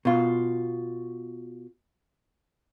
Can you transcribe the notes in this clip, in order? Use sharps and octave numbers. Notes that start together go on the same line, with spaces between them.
B2 F4